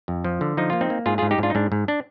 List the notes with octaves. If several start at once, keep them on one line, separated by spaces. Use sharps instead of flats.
F2
F3
D3
F3 D#4
A#3 F4
C4 D#4
A#3
G#2 F4 G#4
F4 G#4
G#2
D#4 G4
G#2 D4 F4
D#4
G#2 D4
G#2
D4